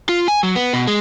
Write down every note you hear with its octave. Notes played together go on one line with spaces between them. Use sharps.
F4
G#5
F#3
B3
B2
G#3